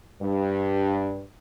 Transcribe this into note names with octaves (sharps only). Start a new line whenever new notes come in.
G2